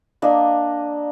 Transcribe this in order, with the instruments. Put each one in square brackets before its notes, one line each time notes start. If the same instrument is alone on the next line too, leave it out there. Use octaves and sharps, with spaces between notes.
[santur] A#3 D4 D#5